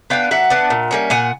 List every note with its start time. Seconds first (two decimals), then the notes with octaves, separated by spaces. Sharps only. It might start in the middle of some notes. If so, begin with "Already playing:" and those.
0.10 B3 D4 F5 G5
0.31 F#3 E5 F#5
0.50 B3 D4
0.70 A#2
0.91 G3 A#3 C#4
1.10 A#2 F#5 G#5